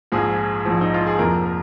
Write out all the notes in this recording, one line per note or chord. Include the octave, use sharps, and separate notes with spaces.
A#1 G#2 F3 G#4
A#1 G#2 F3
D#4
F4
G#4
F1 F2 F3 A#3 A#4
A#4